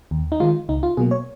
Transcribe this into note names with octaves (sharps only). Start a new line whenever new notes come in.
D#2
D#4
D#3 G#3 F4
C#2 D#4
F4
B2 F#3 A#3 G#4
C#5